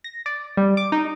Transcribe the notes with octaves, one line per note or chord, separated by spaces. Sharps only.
A#6
D5
G3
D6
D#4